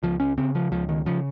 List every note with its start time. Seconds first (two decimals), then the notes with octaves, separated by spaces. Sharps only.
0.03 C#2 F3
0.20 C#4
0.38 C#3 C4
0.55 F3
0.72 C#2 F3
0.89 D#3
1.06 C#3 F3